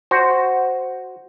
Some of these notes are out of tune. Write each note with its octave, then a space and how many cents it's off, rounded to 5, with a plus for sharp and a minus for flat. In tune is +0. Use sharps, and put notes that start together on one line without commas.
F#4 +0 C5 +0